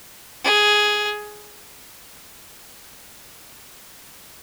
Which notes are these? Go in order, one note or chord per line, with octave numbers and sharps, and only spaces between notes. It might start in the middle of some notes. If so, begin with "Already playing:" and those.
G#4